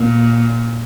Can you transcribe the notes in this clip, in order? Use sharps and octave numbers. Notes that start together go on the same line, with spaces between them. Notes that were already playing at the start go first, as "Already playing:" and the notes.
Already playing: A#2